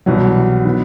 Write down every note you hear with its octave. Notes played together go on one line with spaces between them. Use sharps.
C2 B2 E3 F#3
D#3 F#3 B3